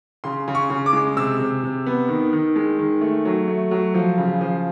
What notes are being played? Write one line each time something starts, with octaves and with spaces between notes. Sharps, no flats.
C#3 C6
C#3
C#6
C#3
D6
G#3
C3 E6
C3
C3
B3
D#3
D#3
G#3
D#3
A3
F#3
A3
F#3
F3
C#3
F3